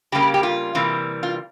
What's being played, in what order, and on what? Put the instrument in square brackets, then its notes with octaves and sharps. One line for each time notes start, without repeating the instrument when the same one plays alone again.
[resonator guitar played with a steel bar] C#3 G3 A#3 G4
G4
F4
C3 E3 G3 A#3
F4